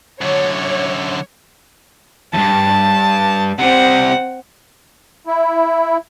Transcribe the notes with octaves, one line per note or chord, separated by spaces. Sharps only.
F#2 D3 C#5
E2 G2 A5
C3 G3 C4 F#5
E4